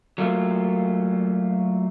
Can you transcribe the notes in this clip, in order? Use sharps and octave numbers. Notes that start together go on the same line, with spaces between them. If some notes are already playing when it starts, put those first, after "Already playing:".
F#3 A3 A#3 F4